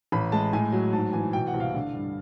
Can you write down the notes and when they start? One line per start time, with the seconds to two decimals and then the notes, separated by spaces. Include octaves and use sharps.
0.12 A1 B5
0.32 G#3 A5
0.53 A2 G#5
0.73 F#3
0.93 G#2 A5
1.13 E3 G#5
1.33 B2 G5
1.47 F#5
1.54 C2
1.60 F5
1.74 D3
1.95 G2